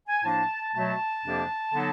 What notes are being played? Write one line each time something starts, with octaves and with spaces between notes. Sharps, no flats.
G#5
A2 F3 A#3 D4 A5
B2 F#3 A3 A5
F2 C3 F3 A#3 D4
D3 F#3 B3 D#4